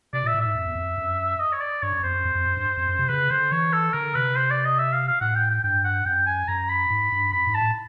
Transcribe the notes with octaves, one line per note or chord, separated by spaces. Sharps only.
C3 D5
A#2 E5
A2
G#2 E5
F2
E2
F2
F#2
D#5
C#5
D5
G2 C#5
F#2
F2 C5
F#2
F2
F2
F#2
G2
F2
F#2
C3
C#3 B4
D3 C5
E3 C#5
A4
D3 A#4
C3 B4
C5
D5
D#5
E5
F5
F5
A2 F#5
G5
G5
G2 G5
F#5
F#2 G5
G#5
F#2 A#5
B5
G#2
G2
F#2 B5
G#2
A5
A2